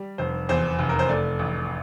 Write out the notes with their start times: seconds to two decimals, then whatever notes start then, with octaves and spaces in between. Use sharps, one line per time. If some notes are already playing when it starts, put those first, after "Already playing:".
Already playing: G3
0.18 F1 C5
0.49 E2 C5
0.79 F1
0.89 A#4
0.99 C5
1.09 A3 D5
1.39 A1